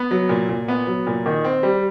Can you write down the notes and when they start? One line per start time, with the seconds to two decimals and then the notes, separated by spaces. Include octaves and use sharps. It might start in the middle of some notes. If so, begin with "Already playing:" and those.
Already playing: B3
0.11 F#3
0.29 A#2
0.49 A#2
0.68 B3
0.87 F#3
1.07 A#2
1.26 D#3
1.44 C4
1.63 G3